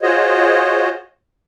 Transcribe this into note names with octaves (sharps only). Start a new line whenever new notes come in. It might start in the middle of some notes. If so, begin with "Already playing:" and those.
F4 F#4 G#4 C5 C#5 D#5